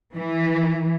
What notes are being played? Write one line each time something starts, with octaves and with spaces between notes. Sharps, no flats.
E3